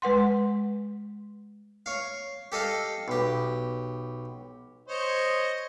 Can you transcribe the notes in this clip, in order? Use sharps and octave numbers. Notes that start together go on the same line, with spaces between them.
G#3 B4 F#5 C6
C#5 F5
G4 A4 D#5 F5
B1 G4
C5 C#5 D#5